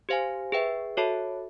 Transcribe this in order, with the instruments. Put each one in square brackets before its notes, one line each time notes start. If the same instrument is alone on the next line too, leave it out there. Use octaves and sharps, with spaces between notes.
[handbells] G4 C5 F5 G#5
G#4 B4 E5 G5
F#4 A4 C#5 E5 A5